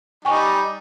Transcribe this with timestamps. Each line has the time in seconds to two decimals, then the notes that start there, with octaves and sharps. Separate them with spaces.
0.25 G3 D#4 G5 G#5 C#6